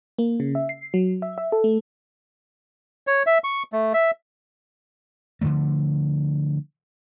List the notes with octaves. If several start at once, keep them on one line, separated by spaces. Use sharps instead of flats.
A#3
C#3
E5
C7
F#3
E5
E5
A4
A3
C#5
E5
C#6
A3
E5
D3 E3 F3 A3